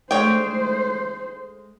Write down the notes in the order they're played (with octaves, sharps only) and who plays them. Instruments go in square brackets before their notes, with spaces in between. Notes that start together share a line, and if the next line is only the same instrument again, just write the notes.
[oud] G#3 A3 D4 [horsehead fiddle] C5 [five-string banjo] C#5 G5